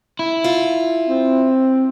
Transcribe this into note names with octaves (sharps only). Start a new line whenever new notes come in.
E4
F4
C4